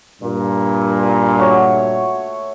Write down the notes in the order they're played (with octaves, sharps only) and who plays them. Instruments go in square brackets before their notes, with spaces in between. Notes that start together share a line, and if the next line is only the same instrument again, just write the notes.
[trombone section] G2 A#2
[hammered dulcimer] A3 F#4 C#5